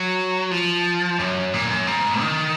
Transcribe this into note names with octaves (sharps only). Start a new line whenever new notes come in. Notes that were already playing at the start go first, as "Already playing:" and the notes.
Already playing: F#3
F3
F#2
A#2
F#2
G#2
D#3